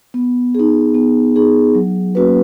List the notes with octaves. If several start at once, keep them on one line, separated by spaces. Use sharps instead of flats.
B3
D#4 G#4
B3
D#4 G#4
F#3
A#3 C#4 F#4 B4